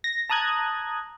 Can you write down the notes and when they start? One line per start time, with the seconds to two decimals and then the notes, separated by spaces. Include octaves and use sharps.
0.04 A#6
0.30 A5 A#5 D#6 F#6 G#6